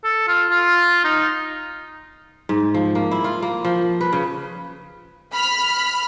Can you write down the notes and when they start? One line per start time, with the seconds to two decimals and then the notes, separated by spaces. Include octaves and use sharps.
0.04 A4
0.27 F4
0.51 F4
1.04 D#4
2.49 G#2
2.74 F3
2.95 A#3
3.11 E4
3.24 F4
3.42 A#3
3.65 F3
4.01 B4
4.13 C#3
5.33 B5 F6 B6